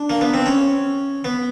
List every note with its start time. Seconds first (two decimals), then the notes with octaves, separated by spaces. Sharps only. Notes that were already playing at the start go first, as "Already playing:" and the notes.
Already playing: D4
0.10 A#3
0.21 B3
0.34 C4
0.46 C#4
1.24 B3